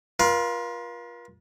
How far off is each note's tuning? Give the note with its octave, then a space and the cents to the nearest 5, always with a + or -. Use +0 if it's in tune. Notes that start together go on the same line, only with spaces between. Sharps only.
F4 +0 A#4 +45